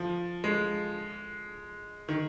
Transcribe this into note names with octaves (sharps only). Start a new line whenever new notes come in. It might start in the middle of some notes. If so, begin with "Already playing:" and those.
Already playing: F3
G#3
D#3